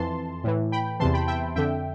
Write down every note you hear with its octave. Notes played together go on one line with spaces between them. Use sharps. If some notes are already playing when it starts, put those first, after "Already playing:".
Already playing: F2 E3 A5 C6
A2 E3
G5 B5
E2 C3 E3 A5 C6
G5 B5
E5 G5
F2 D3 E5 G5